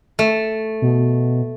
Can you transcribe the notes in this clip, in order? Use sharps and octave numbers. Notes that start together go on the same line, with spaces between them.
A3
B2